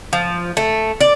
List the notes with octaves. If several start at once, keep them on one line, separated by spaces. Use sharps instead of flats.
F3
A3
D5